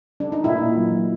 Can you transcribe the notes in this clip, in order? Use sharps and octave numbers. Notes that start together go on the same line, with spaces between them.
D4
D#4
A#2 E4
F#3